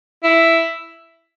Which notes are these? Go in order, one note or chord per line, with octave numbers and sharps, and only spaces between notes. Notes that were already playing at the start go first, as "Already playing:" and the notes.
E4